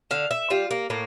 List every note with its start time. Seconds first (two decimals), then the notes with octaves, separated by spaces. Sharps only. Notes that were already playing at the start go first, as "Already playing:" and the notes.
0.11 D3 F5
0.31 E5
0.50 G3 F4
0.71 A#3
0.90 A2 A#3